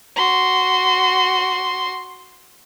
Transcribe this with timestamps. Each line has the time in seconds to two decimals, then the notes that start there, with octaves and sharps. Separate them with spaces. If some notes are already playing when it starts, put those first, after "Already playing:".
0.16 F#4 C6